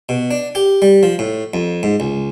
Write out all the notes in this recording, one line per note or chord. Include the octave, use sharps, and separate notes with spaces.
B2
D4
G4
G3
F3
A2
F2
G#2
C#2